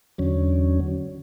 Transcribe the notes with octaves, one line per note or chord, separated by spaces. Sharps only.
E2 D3 F#3 C#4